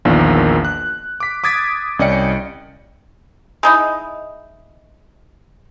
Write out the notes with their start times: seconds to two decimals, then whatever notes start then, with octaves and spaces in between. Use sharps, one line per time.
0.05 A#1 E2 A#2 D#3 F3 A#3
0.65 F#6
1.20 D6 B6
1.44 D6 D#6 G#6 A6 B6 D7
1.99 C2 C#4 D5 D#5 G5 C#7
3.63 G#3 D#4 E4